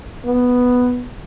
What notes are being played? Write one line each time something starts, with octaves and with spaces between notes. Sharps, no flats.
B3